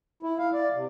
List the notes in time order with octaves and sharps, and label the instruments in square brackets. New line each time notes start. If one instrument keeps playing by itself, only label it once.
[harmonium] E4
F5
D5
C3